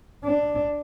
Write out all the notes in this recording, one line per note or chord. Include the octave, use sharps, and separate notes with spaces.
D4